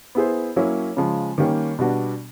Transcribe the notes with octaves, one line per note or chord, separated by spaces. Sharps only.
B3 E4 G#4 C5
F#3 A#3 C#4 E4
C#3 F3 G#3
D#3 G3 A#3 C#4
B2 G3 B3 D4 F#4